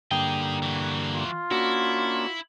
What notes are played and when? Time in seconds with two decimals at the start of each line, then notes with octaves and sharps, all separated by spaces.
0.11 G2 D3 A#3 D#4 G#4 G5
0.63 E3 F#4
1.14 F4
1.51 A#3 C#4 D4 E4 F#4